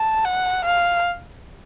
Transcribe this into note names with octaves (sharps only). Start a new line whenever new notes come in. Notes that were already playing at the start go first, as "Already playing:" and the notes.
Already playing: A5
F#5
F5